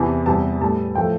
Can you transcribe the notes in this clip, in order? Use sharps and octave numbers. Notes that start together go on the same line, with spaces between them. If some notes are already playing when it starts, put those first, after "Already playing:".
Already playing: E2 C3 E3 A5
E2 C3 G3 A5
A2 G3 A5
A2 F3 A3 G5